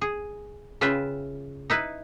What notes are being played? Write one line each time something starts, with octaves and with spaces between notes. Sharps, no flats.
G#4
C#3 F4 B4 E5 G5
D#4 E4 B4